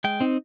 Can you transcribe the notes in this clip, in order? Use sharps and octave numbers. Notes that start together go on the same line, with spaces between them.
G#3 G5
C4 D#4